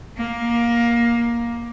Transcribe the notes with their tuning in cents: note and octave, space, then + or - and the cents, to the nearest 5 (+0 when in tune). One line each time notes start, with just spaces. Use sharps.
A#3 +15